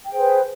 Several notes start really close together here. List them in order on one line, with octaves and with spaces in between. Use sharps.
G5 G#4 C5 B4